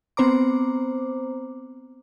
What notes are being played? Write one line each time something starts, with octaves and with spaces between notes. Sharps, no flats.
B3 C4 C5 A#5 D6